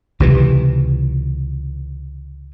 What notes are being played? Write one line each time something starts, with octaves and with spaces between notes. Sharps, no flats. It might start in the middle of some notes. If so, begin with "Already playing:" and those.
C#2 C3 E3